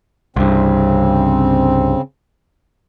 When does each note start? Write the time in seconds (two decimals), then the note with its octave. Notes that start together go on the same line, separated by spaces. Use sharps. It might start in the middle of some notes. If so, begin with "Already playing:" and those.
0.36 C2 G2 C#3 C4